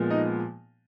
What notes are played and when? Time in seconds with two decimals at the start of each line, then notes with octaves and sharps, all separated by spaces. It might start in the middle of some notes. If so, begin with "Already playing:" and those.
Already playing: A#2 F3 G#3 B3
0.11 D#4 D#5